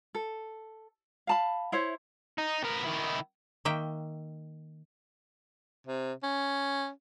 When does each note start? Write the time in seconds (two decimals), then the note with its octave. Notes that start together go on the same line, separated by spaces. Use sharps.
0.15 A4
1.27 F5 A5 B5
1.72 E4 C5 C#5 E5
2.38 D#4
2.64 B3 A#4
2.85 D#3 E4
3.65 D#3 A#3 E5 G5
5.87 C3
6.24 C#4